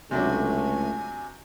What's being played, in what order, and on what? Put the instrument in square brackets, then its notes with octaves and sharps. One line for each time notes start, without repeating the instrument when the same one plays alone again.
[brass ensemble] C#2 A3 [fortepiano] C3 F#3 D4 [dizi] G#5